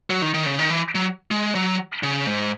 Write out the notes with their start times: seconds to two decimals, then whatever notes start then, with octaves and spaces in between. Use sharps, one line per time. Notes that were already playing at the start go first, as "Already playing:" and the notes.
0.10 F#3
0.22 D#3
0.34 D#3
0.46 C#3
0.59 D#3
0.70 E3
0.95 F#3
1.31 G#3
1.55 F#3
2.03 C#3
2.27 G#2